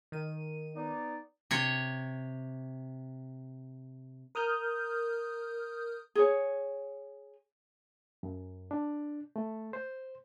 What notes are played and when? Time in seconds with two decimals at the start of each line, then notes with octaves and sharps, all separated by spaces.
0.12 D#3 D#7
0.75 B3 D#4 D5
1.51 C3 C#5
4.35 A#4 D#6 F6 G6
6.15 G#4 C#5
8.23 F#2
8.71 D4
9.36 A3
9.73 C5